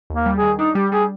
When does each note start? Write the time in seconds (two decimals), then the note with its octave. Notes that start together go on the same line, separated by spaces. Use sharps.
0.10 D#2 A#3
0.26 G3
0.36 G#4
0.43 D#3
0.59 D4 D#4
0.75 G3 G4
0.92 G3 G#4